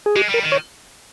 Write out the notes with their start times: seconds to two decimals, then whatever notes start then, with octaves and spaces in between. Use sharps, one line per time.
0.06 G#4
0.16 G#3 G4
0.29 G3 A#4
0.43 D#3
0.52 C#5